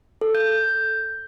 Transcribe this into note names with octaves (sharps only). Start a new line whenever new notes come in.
A4
G6